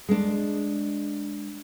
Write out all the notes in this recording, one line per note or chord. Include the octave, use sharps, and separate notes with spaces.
G#3 D4